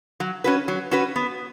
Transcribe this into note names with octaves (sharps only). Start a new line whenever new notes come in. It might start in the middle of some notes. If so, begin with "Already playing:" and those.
F#3
C#4 F#4 B4
F#3
C#4 F#4 B4
B3